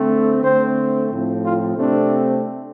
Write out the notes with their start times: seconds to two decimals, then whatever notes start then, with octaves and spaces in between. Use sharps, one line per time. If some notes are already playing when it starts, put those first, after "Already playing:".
Already playing: D3 A3 C4
0.42 D3 A3 C4 C5
1.09 A2 F3 C4
1.43 F4
1.76 C3 A3 C4 D4